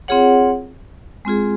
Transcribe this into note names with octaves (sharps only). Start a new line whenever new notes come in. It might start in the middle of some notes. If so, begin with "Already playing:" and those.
C4 F4 G#4 C#5 F#5
G#3 C4 F4 G#4